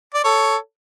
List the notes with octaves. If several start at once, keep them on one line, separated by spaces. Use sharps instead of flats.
D5
A4 C#5